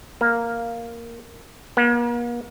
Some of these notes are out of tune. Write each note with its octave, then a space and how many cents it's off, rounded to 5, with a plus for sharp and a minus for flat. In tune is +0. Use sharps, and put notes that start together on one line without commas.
A#3 +0
A#3 +45